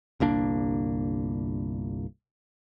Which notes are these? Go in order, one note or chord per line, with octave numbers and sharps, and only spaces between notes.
G1 C2 A#3 D4